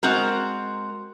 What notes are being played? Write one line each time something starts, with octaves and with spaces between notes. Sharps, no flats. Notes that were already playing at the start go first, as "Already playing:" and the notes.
G#3 C4 F#4 A#4